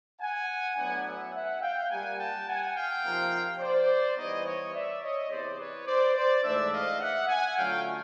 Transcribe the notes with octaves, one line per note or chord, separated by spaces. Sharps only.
F#5 G#5
A2 F#3 B3 D4 F#5 G#5
E5 F#5
E5 F#5
F5 G5
A#2 G3 A#3 F#5 G#5
G5 A5
F#5 G#5
F5 G5
C3 F3 A#3 D#4
C5 D5
E3 G3 B3 D#4 C#5 D#5
C#5 D#5
D5 E5
C#5 D#5
E2 C3 E3 C5 D5
B4 C#5
C5 D5
C5 D5
G#2 E3 A3 D4 D5 E5
D#5 F5
E5 F#5
F#5 G#5
D3 F#3 A3 C#4 F4 F5 G5